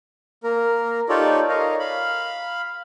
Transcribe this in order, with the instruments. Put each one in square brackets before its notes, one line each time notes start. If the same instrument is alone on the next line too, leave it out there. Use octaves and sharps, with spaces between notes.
[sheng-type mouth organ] A#3 A#4
D#4 F4 G4 A4 C#5 D5
A#4 C#5 D#5 F5
F5 B5